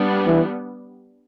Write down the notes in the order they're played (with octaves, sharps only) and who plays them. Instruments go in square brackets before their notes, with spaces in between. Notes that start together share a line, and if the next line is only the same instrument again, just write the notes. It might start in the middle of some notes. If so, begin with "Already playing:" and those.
Already playing: [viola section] G3 B3 D4
[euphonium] E3